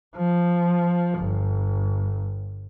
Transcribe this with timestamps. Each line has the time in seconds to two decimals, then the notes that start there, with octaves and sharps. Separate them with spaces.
0.16 F3
1.18 G1